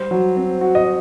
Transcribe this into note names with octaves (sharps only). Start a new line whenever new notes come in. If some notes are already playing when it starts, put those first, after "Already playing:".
Already playing: G3 C5
F#3
C4
F#4
D#5